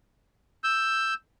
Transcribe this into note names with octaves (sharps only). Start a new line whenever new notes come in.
E6 G6